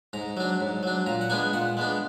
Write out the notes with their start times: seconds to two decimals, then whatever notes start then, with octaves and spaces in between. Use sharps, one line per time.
0.13 G#2 A#5
0.37 F#3 D4
0.60 G#2
0.83 F#3 D4
1.06 A#2 A#5
1.21 F#5
1.30 G#3 B3 D4 G#5
1.53 A#2 F#5
1.77 G#3 B3 D4